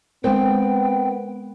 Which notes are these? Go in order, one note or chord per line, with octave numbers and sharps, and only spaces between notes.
G#3 B3 C4 A#4 G5